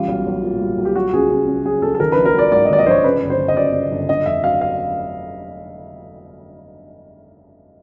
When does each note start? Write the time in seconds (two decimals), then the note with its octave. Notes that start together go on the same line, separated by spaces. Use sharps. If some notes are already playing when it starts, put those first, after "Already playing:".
Already playing: A1 G3 F4
0.08 B1
0.27 B1
0.43 A#2
0.61 G3
0.78 B1
0.85 G4
0.96 F#3 F#4
1.13 C#2 G#4
1.30 C#2
1.47 C#3
1.65 F#3 G#4
1.82 C#2 A4
1.95 A4
2.00 D#3 A#4
2.12 A#1 B4
2.25 A#4
2.34 F#3 D5
2.52 G#2 D5
2.65 D#5
2.70 D#3 D5
2.79 D#5
2.86 A#1 C5 C#5
3.04 C#3 B4
3.22 G1
3.30 C5
3.38 G1
3.48 D#5
3.57 F#2 D5
3.73 C#3
3.91 G1
4.09 D3 D#5
4.26 F1 E5
4.43 F#3 F5
4.61 F5